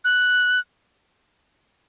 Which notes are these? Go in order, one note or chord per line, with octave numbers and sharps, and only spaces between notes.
F#6